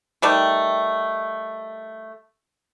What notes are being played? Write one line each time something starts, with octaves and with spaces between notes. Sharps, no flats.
D#3 G3 A3